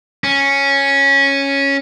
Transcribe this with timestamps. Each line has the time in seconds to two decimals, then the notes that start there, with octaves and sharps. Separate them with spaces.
0.24 C#4